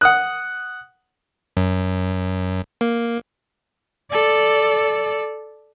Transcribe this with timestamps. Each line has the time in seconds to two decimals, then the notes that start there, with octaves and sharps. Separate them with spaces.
0.01 F#5 D#6 F#6
1.57 F#2
2.81 A#3
4.11 A4 D5